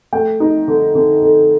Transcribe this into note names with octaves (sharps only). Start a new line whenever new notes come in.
A3 G5
D#4
D3
D3
D3